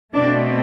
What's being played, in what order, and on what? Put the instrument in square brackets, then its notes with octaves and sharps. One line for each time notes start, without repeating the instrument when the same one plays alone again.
[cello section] B2 A3 C4 D4